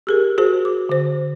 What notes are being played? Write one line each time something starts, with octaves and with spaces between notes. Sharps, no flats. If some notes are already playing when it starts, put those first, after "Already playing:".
G4 G#4 A#4
F#4 G#4 C5
D6
D3 C5